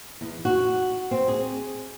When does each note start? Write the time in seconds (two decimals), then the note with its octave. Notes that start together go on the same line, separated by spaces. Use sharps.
0.21 E2
0.45 F#4
1.11 C4
1.28 G#4